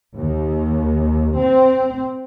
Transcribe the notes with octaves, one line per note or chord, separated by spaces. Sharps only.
D#2
C4